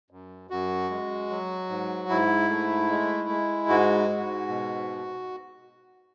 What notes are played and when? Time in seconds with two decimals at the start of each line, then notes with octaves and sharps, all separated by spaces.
0.11 F#2
0.50 F#2 F#4
0.90 G#3
1.30 F#3
1.69 G#2
2.09 G#2 E4
2.49 A3
2.90 G#3
3.29 G#3
3.69 G#2 F#4
4.09 G#2
4.48 B2